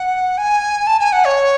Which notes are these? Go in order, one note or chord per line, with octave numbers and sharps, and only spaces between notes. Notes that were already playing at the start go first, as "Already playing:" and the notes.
Already playing: F#5
G#5
A5
G#5
F#5
C#5